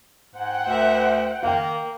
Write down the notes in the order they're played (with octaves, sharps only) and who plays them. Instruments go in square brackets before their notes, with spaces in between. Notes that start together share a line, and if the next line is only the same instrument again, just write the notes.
[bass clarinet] G#2 [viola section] C5 F#5 G5
[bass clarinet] D2 [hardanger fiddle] A#4 E5
[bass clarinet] D#3 [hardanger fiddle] A#3 [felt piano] F5 G5